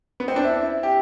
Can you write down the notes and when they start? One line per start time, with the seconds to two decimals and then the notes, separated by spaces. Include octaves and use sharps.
0.20 B3
0.28 C4
0.36 D4
0.44 E4
0.83 G4